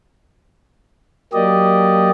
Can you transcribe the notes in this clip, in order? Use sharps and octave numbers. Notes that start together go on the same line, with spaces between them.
F#3 A#3 G4 D5 D#5